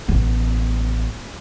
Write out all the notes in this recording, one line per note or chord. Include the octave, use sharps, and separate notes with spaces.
A1 B3